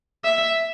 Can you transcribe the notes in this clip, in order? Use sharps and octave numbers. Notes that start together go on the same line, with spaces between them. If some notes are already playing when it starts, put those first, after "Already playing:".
E5